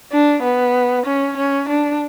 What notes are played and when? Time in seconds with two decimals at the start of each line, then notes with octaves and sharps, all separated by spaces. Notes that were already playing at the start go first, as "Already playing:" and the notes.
0.12 D4
0.43 B3
1.06 C#4
1.37 C#4
1.68 D4